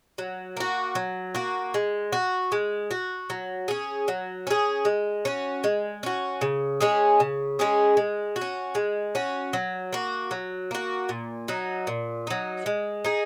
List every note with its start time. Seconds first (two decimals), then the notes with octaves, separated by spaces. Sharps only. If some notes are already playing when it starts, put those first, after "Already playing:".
0.18 F#3
0.57 A#3 F#4
0.95 F#3
1.35 A#3 F#4
1.74 G#3
2.12 F#4
2.52 G#3
2.91 F#4
3.30 F#3
3.68 C#4 G#4
4.08 F#3
4.47 C#4 G#4
4.85 G#3
5.25 C#4 F#4
5.64 G#3
6.03 C#4 F#4
6.41 C#3
6.81 G#3 C#4 G#4
7.20 C#3
7.59 G#3 C#4 G#4
7.97 G#3
8.36 F#4
8.41 C#4
8.75 G#3
9.15 C#4 F#4
9.53 F#3
9.93 A#3 F#4
10.31 F#3
10.71 A#3 F#4
11.09 A#2
11.48 F#3 D#4
11.87 A#2
12.27 F#3 D#4
12.66 G#3
13.04 D#4 G#4